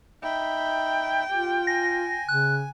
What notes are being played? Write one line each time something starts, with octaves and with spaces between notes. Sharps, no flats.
D#4 E5 G5 B5
F4 G4
G#5 A#6
C#3 F#6